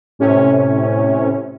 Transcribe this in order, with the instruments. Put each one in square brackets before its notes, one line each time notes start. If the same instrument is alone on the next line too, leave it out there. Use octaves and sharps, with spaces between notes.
[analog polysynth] A2 C3 C#4